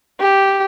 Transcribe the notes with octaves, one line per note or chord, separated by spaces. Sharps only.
G4